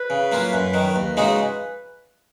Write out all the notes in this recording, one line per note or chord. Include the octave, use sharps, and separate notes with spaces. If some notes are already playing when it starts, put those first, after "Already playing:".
Already playing: B4
C#3
F#3 A#3 F4
F#2
D#3 F#3
D#2 B4
C#3 G#3 D#4 F#4